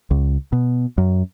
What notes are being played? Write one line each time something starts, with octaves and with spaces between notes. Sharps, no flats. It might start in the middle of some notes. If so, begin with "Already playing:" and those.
C#2
B2
F#2